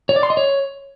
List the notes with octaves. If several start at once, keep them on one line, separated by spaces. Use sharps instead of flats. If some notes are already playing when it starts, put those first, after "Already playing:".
C#5
D5
C6
D#5
C#5